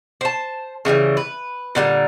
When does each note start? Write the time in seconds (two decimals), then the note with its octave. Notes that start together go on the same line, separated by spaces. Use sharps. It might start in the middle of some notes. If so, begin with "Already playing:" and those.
0.21 C5 A5
0.85 C#3 E3 F3 G3
1.17 B4
1.75 A#2 D3 D#3 G3